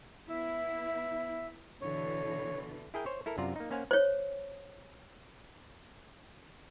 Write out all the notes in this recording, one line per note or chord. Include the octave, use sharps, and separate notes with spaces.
B3 E4 E5
B2 D3 E3 C#5
E4 G#4 A#4 G5
C5 C#5
E4 A4 A#4
F#2 C3 F4 D5 A#5
A#3 D#4
A#3 C#4 C5 F5 F#5 G#5
C5 C#5